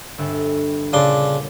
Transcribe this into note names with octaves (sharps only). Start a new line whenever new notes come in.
G1 E5
A#2 C#3 D4 D5 C6